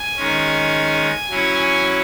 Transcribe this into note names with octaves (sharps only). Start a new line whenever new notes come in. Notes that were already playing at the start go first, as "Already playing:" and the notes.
Already playing: G#5
D#3 G#3 C#4
F#3 C#4 E4 G#5
G#5